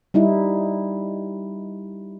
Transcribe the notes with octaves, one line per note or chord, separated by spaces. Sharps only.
G3 D#4 E4